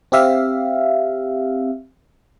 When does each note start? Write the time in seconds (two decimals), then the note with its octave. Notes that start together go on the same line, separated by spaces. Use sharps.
0.12 C4 G4 E5 F5